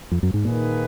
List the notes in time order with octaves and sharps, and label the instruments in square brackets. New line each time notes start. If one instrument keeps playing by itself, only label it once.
[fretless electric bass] F2
F#2
G#2
[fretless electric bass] A#2 [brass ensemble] D#3 A#3 D#4 G#4 B4